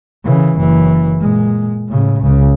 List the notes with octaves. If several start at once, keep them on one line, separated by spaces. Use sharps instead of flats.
C#3 E3
F#1 E3
A#2 G#3
A2 C#3
C#2 C#3